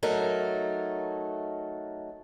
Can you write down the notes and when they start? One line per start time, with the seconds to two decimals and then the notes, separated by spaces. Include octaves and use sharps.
0.03 F#3 A3 D#4 A#4